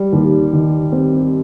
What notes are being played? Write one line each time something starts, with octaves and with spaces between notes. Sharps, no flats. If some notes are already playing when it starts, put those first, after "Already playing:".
Already playing: G3
D#2
D#3
C4